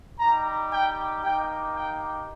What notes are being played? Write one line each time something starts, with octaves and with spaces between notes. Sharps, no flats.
G3 D#4 G4 A#5
G5
A#3 D#4 G4 G5
G5